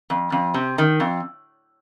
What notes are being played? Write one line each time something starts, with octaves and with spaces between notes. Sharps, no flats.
F2
F2
C3
D#3
F2